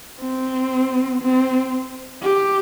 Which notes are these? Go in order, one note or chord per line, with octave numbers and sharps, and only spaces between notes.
C4
C4
G4